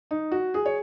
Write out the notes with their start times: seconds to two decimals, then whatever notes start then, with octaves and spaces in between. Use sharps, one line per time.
0.11 D#4
0.31 F#4
0.54 G#4
0.66 C#5